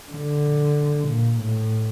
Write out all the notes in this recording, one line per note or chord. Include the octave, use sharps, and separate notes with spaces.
D3
A#2
A2